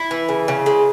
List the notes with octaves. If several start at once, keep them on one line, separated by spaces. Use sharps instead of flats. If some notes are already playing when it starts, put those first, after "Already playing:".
Already playing: E4
E3
C#3
C#3
G#3